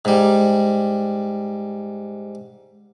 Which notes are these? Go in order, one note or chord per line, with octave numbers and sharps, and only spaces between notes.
G#2 G3